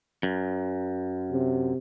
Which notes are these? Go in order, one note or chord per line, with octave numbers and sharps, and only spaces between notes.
F#2
C3